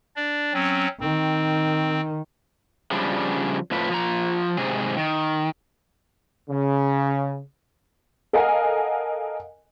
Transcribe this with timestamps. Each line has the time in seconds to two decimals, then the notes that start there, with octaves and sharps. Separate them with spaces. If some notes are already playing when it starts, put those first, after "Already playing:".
0.16 D4 D5
0.53 F#3 C4 C#4
1.00 D#3 C4
2.91 C#3 F3 G3 D4
3.71 F2 A2 F3 B4
3.89 F3 F4 A#5
4.57 G#2 C3 G#4
4.97 D#3
6.50 C#3
8.33 A4 A#4 D#5 F5 F#5 G#5